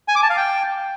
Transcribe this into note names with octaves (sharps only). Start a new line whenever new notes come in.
G#5
D6
A5
F5
G5